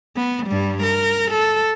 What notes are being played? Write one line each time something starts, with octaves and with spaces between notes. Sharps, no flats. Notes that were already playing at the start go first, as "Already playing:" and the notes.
B3
G2 G3
A#4
A4